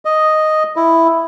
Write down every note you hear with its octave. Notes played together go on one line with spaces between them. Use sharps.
D#5
E4